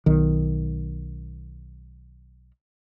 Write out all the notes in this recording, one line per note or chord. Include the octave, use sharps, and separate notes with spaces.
B1 D#3